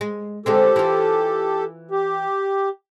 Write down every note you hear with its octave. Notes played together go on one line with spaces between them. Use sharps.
G#3
D3 G#3 C4 G4 A4
E3 F4
G4